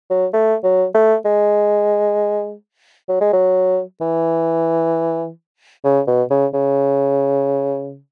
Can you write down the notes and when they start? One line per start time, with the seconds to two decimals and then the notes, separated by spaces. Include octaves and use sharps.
0.10 F#3
0.34 A3
0.64 F#3
0.94 A3
1.25 G#3
3.09 F#3
3.21 G#3
3.33 F#3
4.01 E3
5.84 C#3
6.07 B2
6.30 C#3
6.54 C#3